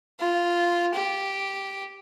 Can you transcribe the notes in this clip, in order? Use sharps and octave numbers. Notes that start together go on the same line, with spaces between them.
F4
G4